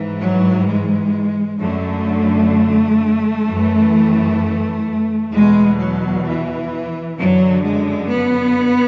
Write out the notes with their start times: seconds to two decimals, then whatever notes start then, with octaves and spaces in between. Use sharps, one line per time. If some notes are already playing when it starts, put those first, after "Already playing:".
Already playing: G#2 E3
0.22 F#3
0.68 G#3
1.60 F#2 D3 A3
3.46 F#2 E3
5.32 E2 B2 G#3
5.79 F#3
6.26 E3
7.18 F#2 D3 F#3
7.65 G#3
8.11 B3